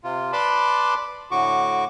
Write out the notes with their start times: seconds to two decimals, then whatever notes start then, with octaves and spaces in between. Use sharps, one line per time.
0.04 C3 F4
0.33 B4 D5 A5 B5 C6 D6
1.31 A2 D3 F#4 C#6 D6